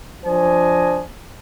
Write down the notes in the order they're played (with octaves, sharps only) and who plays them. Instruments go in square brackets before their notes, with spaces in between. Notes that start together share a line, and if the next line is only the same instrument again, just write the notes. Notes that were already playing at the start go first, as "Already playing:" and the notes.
[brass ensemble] F3 D4 C5 D#5 G#5